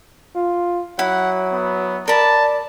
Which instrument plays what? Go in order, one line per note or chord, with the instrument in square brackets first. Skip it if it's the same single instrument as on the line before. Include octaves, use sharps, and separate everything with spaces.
[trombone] F4
[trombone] F#3 [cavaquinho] E4 [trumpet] F#5
[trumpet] B3
[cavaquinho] A#4 B5 [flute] D5 [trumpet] A5